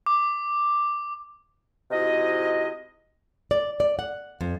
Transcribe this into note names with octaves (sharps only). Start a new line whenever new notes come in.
D6
G#2 C3 E4 F#4 D#5
D5
D5
F#5
F2